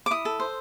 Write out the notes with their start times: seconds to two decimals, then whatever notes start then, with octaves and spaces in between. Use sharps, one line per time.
0.06 D6
0.10 E4 D#6
0.25 A4
0.40 C5